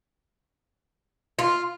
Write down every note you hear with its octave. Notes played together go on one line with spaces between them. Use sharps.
F4